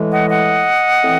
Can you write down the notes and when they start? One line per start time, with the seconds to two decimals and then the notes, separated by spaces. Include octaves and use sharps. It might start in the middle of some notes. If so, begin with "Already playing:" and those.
Already playing: A2 E3 G#3
0.11 D#5 F#5
0.30 D#5 F#5
1.02 A2 E3 C4